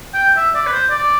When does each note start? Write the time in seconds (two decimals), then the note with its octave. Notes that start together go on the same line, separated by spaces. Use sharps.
0.14 G5
0.37 E5
0.55 D5
0.67 B4
0.72 C5
0.90 D5